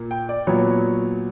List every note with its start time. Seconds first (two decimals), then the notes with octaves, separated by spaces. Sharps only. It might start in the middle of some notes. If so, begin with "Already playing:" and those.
Already playing: A#2 A#3
0.11 G5
0.29 D5
0.47 A#2 F#3 B3 C#5